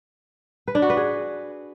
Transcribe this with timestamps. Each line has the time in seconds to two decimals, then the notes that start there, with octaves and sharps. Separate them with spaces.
0.68 B4
0.75 D4
0.82 F#4
0.90 B4
0.97 G#4